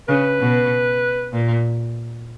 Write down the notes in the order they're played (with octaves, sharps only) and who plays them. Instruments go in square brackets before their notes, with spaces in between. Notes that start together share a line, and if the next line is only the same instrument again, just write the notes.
[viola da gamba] C#3 [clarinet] B4
[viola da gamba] B2
A#2